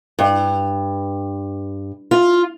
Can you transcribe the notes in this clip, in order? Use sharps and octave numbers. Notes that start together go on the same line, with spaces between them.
G2
F4